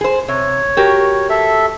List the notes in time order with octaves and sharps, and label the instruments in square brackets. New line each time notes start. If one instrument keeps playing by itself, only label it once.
[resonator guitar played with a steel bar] G#4 C5
[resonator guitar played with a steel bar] C3 [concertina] C#5
[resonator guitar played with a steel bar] F#4 G4 A#4
[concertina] A4 E5